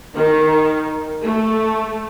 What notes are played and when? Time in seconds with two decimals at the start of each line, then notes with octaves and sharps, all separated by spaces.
0.14 D#3
1.23 A3